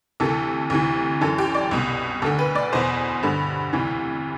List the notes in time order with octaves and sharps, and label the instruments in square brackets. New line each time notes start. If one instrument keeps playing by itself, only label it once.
[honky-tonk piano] D2 C3 E3 A4
D2 C3 E3
F#2 E3 A4
G4
D5
C2 B2
D2 A4
D3
B4
D5
E2 B2 C5
G2 D3
D2 C3 E3